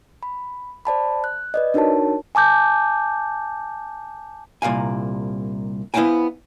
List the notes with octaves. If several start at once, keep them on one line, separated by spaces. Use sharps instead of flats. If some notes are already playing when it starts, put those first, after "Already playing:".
B5
C5 D5 A5 B5
F#6
B4 D5 D#5
D4 D#4 F#4 A#4 C#5 A5
G#5 A5 D6 G6
C2 A#2 F5 G#5
B3 E4 C5 F5 G5 G#5